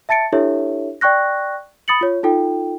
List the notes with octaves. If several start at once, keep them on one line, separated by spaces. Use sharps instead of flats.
E5 A5 A6 C#7 D7
D4 E4 G4 A4 C#5 E5
D5 G5 C#6 F#6 A#6
B5 D#6 A6 C#7 F#7
F4 C#5
D#4 F4 A4 G5